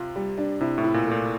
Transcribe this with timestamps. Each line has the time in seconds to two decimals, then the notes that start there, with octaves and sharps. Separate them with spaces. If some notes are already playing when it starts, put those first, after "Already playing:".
Already playing: C3 F4
0.16 G3
0.38 D4
0.61 C3 E4
0.78 A2
0.84 E4
0.94 A#2
1.06 A3
1.11 A#2